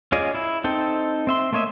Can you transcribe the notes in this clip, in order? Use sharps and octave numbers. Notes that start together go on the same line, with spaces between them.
C#4 F4 G#4 D5 D#5
E4
C4 D#4 A4 G5
C4 E5 C6
A3 A#3 C#5 D#5 E5